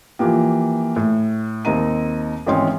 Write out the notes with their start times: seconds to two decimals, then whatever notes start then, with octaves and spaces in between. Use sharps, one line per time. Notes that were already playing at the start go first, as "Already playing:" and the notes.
0.19 E3 F3 A#3 G4
0.96 A2
1.65 D#2 C4 D#4 A#5 D#7
2.46 G#1 E3 G#3 C#4 G5 C6